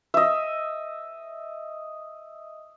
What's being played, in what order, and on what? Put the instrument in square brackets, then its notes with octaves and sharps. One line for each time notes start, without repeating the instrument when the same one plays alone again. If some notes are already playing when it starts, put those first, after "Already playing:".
[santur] D#5 E5